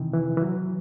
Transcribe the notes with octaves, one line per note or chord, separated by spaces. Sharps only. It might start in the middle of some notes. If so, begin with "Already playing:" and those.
Already playing: C3 D#3 E3
E3
E3
F#3